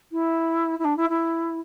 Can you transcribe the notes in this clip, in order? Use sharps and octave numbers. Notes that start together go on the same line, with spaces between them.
E4
E4
D4
E4
E4